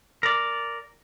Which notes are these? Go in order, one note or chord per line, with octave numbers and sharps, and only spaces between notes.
A#4 D5